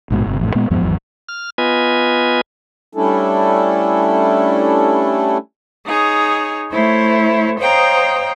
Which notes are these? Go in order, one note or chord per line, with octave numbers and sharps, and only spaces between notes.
A#1 G#2 B2
G1 C3
A1 F2 A2
A#2 G#3 B3
E2 G#2 F3 B3
G#1 E2 F#3
F6
B3 F4 B4 D#5 G#5
G3 A3 C#4 D4 E4 A4
D#4 G#4 C#5
A3 E4 C5 C#5
C5 C#5 D#5 F5 G5 A#5